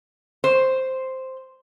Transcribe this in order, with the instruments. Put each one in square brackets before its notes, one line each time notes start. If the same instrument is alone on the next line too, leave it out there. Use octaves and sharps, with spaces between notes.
[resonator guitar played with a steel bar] C5